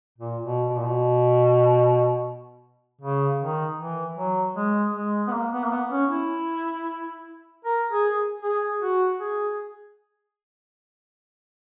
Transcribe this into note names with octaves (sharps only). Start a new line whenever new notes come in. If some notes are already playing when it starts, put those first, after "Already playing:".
A#2
B2
B2
A#2
B2
C#3
D#3
E3
F#3
G#3
G#3
B3
A#3
B3
A#3
B3
C#4
E4
A#4
G#4
G#4
F#4
G#4